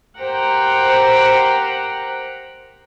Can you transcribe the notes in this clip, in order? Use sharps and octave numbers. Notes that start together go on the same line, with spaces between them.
G4 A#4 C5 F#5 G5 A#5